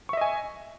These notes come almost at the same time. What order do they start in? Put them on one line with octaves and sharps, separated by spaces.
C#6 E5 D#5 G#5